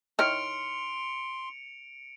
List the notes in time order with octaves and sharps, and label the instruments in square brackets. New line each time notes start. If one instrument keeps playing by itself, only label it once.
[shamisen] D#3 E4 C#5 [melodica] C6 [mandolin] F6 [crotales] C#7 D7 F7